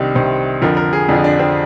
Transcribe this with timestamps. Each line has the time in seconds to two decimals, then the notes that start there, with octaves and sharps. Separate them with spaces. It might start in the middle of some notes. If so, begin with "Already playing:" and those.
Already playing: C2 C3 D#3 D4
0.15 C2 C3 D#3 C5
0.61 F2 D3 F3 A#4
0.77 A#4
0.93 G#4
1.09 F2 D3 F3 D4
1.24 D4
1.39 C4